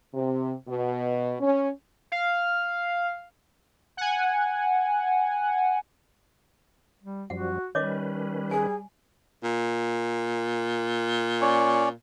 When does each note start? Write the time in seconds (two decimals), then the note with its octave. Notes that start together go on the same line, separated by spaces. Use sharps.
0.14 C3
0.68 B2
1.40 C#4
2.12 F5
3.97 F#5 G#5
7.02 G3
7.30 F#2 F3 G3 F#4 F#5
7.75 D#3 G3 C#4 B4 C#5 D#5 D6
8.51 G#4 G#5
9.44 A#2
11.41 C#4 C#5 D5